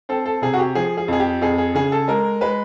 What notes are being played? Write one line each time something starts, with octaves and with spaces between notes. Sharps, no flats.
C4 A4
A4
C3 G#4
F#4
G4
F3 G#4
G#4
F2 G#4
G4
F2 G#4
G#4
C#3 G#4
A4
G#3 A#4
G#3 B4